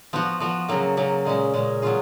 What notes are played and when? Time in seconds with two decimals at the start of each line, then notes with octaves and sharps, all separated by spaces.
0.13 F3 B3 F#4
0.40 F3 B3 F#4
0.69 C#3 F#3 A#3
0.97 C#3 F#3 A#3
1.25 A#2 G#3 C#4
1.54 A#2 G#3 C#4
1.82 F#3 B3 F4 G#4